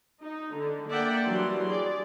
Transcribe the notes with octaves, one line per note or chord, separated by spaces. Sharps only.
D#4
D3
A#3 D4 D5 E5 F#5 G5
E3 F#3 G3 D4 C6
G#4 D5